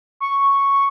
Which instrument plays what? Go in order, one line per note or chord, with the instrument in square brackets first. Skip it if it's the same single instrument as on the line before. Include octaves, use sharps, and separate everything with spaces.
[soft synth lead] C#6